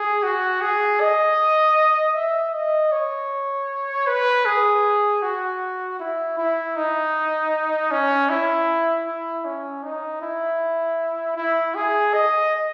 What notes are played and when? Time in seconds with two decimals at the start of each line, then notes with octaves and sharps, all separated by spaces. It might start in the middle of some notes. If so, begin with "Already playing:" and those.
Already playing: G#4
0.23 F#4
0.61 G#4
1.00 D#5
2.15 E5
2.54 D#5
2.92 C#5
4.07 B4
4.46 G#4
5.22 F#4
5.99 E4
6.38 E4
6.76 D#4
7.91 C#4
8.29 E4
9.06 E4
9.45 C#4
9.83 D#4
10.22 E4
11.36 E4
11.75 G#4
12.14 D#5